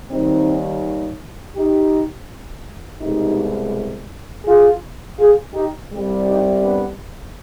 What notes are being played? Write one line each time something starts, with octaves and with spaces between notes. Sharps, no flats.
D#2 D#3 G3 C4 D#4
D#4 G4
C2 B2 G#3 D#4 G4
F4 G#4
F4 G#4
D#4 G4
C2 C3 G3
D#4 G4
B3 D4